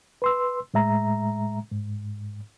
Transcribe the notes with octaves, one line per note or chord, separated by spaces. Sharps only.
B4 C6 E6
A2 G#3 E5 A#5
G#2